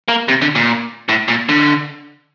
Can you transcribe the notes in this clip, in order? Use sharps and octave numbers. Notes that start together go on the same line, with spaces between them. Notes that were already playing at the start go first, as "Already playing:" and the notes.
A#3
C3
D3
A#2
A2
A#2
D3